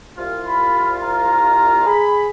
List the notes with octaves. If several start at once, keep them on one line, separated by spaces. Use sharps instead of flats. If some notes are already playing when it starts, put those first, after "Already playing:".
C2 F4
B5
A#5
G#4 B5